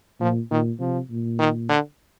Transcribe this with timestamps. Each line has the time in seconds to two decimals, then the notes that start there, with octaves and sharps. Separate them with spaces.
0.20 A#2 F3
0.51 A#2 D#3
0.80 C3 F3
1.10 A#2
1.39 D#3
1.69 D3